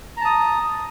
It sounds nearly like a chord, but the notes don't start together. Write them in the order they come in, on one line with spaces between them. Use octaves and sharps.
A#5 A5 D#6